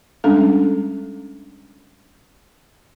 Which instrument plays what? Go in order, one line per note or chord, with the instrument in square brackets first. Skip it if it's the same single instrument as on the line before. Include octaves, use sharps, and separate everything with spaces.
[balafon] G3 G#3 C#4 D4 A4